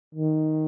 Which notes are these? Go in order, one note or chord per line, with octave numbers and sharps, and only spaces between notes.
D#3